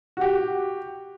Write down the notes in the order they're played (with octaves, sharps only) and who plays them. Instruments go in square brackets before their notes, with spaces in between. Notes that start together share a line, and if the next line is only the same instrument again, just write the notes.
[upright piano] F#4 G4